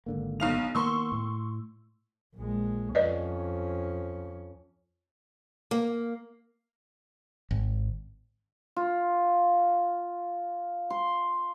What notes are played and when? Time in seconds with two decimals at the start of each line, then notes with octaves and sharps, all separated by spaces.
0.06 G#1 D3 A#3
0.40 B1 F5 F7
0.75 D#3 A#3 B3 C6 C#6 E6
1.12 A2
2.36 A#1 G#3
2.95 F2 C#4 B4 D5 D#5
5.71 A#3
7.51 G#1
8.76 F4
10.90 C6